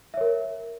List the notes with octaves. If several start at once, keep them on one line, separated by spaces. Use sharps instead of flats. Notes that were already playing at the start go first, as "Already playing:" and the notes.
A#4 C#5 E5